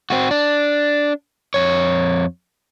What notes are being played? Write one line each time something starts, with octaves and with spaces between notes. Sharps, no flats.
C4 F#4
D4
F2 C#5